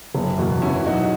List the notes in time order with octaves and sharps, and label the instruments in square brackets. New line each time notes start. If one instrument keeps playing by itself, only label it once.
[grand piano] F#1
E2 B2 A#3
[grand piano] B2 [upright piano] C#4 E4
[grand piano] F#3 C#4 [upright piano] D#4 F#4